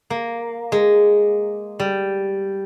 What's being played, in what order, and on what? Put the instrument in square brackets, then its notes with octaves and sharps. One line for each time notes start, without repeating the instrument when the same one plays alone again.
[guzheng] A#3
G#3
G3